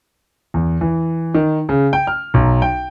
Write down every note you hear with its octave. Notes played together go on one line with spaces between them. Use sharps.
E2
E3
D#3
C#3
G5
F6
B1
G5